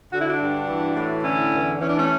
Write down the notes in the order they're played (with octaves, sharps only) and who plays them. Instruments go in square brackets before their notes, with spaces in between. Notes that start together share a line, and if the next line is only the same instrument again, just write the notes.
[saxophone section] D3 F#4
E4
D4 F#4
G2
E3
A2
D3 C#4 E4
E2
E3 C#4
D4
A3 C#4